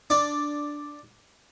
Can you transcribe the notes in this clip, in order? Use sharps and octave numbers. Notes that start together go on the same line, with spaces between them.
D4